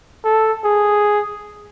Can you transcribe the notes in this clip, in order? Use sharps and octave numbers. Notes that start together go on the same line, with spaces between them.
A4
G#4